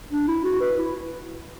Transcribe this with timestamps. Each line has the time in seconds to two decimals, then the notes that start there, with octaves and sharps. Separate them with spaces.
0.11 D4
0.28 E4
0.45 F#4
0.61 B4
0.78 E4